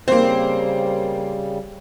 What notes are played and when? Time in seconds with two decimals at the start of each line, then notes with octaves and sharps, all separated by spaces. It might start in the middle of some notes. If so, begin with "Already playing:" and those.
0.08 C#3 G3 A#3 C4 C5